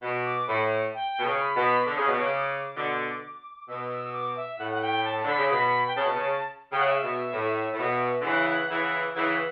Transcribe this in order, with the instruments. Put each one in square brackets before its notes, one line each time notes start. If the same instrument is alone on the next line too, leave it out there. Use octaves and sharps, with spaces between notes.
[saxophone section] B2
[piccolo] D6
[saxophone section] A2 [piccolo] B5
[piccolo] G5
[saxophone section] B2
C#3
[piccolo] C#6
B5
[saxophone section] B2
[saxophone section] D3 [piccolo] D6
[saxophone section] C#3
B2
C#3
B2 D3
[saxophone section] B2 [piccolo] E6
[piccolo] E6
D6
E5
[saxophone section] A2 [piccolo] F#5
[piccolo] F#5
G5
A5
[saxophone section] D3 [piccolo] B5
[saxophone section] C#3
[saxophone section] B2 [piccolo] B5
[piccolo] G5
[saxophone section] C#3 [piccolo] A5
[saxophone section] B2
C#3
[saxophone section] C#3 [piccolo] G5
[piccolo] F#5
E5
[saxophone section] B2
A2
A2
B2
D3
[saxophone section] C#3 E3 [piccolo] F#5
[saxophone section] C#3 E3 [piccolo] E5
[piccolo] F#5
E5
E5
[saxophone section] C#3 E3 [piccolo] F#5